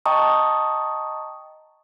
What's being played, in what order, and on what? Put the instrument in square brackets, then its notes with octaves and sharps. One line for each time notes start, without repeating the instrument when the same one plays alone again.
[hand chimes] D#5 G5 A5 A#5 C#6 D#6